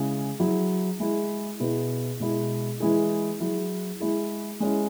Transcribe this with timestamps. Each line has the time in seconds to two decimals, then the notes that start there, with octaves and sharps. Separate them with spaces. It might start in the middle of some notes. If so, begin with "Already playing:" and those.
Already playing: C#3 G#3 E4 G#4
0.40 F#3 E4 G#4
0.99 G#3 E4 G#4
1.60 B2 B3 E4 G#4
2.20 B2 G#3 E4 G#4
2.80 E3 G#3 E4 G#4
3.40 F#3 E4 G#4
4.00 G#3 E4 G#4
4.60 G#3 C#4 E4